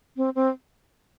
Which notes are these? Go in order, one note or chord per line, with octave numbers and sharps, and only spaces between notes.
C4
C4